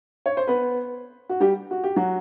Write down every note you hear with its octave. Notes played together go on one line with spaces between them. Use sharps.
C#5
C5
B3 B4
F#4
G3 G4
F#4
G4
F#3 F#4